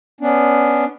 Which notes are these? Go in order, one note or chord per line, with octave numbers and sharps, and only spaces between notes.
B3 C#4 D4